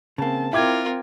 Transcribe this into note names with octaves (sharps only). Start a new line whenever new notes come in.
C#3 A#3 C4 A5
C4 E4 F4 A#4 G5 D6 G#6